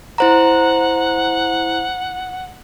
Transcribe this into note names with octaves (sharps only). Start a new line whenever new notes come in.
E4 C5 F#5 A#5